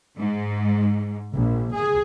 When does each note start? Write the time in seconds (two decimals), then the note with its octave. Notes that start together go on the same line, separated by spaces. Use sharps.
0.17 G#2
1.33 A#1
1.73 G#4